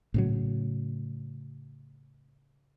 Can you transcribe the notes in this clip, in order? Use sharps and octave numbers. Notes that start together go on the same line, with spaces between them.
A2 C#3 F#3